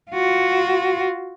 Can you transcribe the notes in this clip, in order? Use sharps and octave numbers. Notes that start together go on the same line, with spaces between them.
F4 F#4